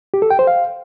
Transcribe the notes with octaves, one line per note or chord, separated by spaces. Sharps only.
G4
A4
G5
C5
F5